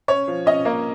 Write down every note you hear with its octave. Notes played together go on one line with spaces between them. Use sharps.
C#4 C#5
F3
C#4 D#5
A#3